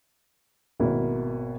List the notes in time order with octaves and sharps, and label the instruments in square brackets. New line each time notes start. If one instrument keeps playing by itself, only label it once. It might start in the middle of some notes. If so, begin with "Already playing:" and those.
[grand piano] G#1 B2 A#3 E4